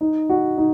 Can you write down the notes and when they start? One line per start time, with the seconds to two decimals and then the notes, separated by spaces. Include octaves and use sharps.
0.01 D#4
0.29 F#4
0.58 D#4